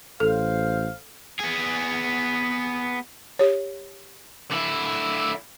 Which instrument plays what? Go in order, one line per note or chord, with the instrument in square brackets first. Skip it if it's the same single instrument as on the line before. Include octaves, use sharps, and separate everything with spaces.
[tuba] A1 [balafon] A4 [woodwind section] C5 F5
[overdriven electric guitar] B3 G#4
[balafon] G4 C#5
[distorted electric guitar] D3 E4